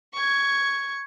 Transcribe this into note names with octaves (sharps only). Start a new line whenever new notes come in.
C#6 G#6